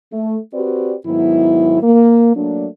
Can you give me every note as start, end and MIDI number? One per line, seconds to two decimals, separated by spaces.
0.13 0.38 57
0.54 0.95 60
0.54 0.95 66
0.54 0.95 67
0.54 0.95 71
0.54 0.95 74
1.06 1.79 44
1.06 1.79 51
1.06 1.79 54
1.06 1.79 59
1.06 1.79 64
1.83 2.32 58
2.36 2.67 54
2.36 2.67 57
2.36 2.67 58
2.36 2.67 62